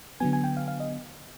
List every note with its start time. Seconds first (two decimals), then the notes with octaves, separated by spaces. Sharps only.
0.20 D3 F#3 B3 G#5
0.33 G#5
0.44 G5
0.57 F5
0.68 F5
0.80 D#5